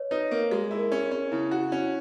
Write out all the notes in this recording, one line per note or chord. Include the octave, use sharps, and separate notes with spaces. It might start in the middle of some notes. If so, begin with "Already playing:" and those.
Already playing: B4 C#5 D#5
D#4 B4
A#3 A#4
G#3 G#4
E4
A#4
C#4 G#4
C#4
C#3 E4
E4 F#4
C#4